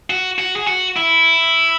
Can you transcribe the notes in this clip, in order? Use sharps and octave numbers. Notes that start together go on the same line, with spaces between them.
F#4
F#4
G#4
F#4
E4